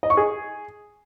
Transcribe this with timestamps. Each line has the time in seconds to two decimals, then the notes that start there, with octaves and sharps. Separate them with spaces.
0.03 D#5
0.10 C#6
0.17 G#4